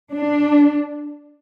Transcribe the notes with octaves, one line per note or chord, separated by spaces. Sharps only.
D4